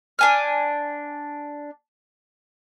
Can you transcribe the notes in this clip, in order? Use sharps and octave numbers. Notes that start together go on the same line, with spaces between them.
D4 G#5 F6